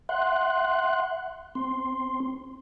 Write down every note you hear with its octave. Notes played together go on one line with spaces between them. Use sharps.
E5 F#5 C6 F#6
C4 C6